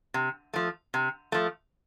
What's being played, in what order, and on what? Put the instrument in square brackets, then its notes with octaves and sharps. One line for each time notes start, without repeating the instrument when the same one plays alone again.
[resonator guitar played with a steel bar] C3
F3 A3
C3
F3 A3